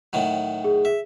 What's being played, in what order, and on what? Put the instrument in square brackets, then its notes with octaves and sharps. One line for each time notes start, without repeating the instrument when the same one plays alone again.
[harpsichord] A2 D#3 F#3
[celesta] G#4
[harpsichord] E5